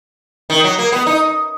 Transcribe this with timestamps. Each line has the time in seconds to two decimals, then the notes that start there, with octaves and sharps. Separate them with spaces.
0.50 D#3
0.64 F#3
0.79 A#3
0.92 B3
1.06 D#4